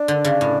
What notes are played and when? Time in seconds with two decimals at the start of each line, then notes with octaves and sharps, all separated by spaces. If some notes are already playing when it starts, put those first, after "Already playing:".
Already playing: D4
0.08 D3
0.25 C#3
0.41 A2